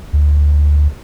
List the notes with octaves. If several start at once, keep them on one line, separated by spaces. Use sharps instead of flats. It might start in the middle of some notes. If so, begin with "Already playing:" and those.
D2